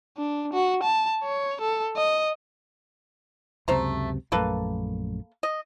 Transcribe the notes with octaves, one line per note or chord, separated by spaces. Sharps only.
D4
F#4
A5
C#5
A4
D#5
C#2 F#2 C3 A3 C5 A#5
A#1 F#2 A3 A#3 A4 B4
D#5